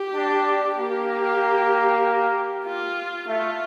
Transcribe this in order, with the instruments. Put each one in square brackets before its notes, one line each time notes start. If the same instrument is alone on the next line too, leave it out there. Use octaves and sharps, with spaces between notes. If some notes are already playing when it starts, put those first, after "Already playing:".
Already playing: [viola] G4
[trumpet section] D4
[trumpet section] A#3 [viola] G4
[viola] F4
[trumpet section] A3 [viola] F4